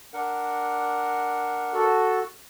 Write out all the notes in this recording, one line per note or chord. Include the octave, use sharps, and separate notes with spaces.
D4 A#4 F#5
F#4 A4